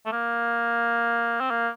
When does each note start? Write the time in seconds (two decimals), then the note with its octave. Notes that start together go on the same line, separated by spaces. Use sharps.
0.06 A3
0.12 A#3
1.40 C4
1.51 A#3